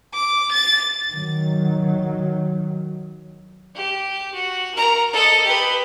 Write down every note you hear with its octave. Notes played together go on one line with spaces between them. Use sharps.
D6
A6
D#3 F#3
G4
F#4
A#4 A#5
A4 D#5
G4 B4